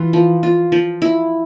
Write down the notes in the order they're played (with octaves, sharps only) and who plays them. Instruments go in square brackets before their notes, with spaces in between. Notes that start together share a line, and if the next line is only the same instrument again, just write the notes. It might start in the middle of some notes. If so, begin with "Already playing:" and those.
Already playing: [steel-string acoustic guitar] E3 [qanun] F4
[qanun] F3
F4
F3
E4